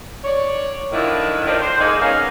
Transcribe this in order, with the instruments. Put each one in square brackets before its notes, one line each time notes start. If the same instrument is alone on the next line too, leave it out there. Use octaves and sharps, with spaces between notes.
[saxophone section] C#5 D5
D3 D#3 F3 D4 E4
A2 D#3 D4 F4 C5
C5
G#3 A#3 D#4 G#4
A#3 B3 C#4 D#4 G#4 F5